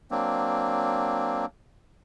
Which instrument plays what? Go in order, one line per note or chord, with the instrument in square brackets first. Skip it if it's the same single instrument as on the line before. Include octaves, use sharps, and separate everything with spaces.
[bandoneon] F#3 A#3 C4 D4